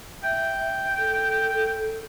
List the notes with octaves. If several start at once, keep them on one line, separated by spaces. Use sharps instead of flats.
E5 G5
A4